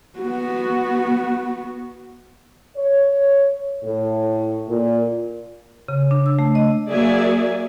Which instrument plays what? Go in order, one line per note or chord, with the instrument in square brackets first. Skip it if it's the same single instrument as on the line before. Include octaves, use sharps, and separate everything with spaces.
[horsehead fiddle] B3 F#4
[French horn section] C#5
A2
A#2
[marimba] C#3
D4
E6
A3
D#5
[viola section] F#3 A#3 G#4 D5 E5 G#5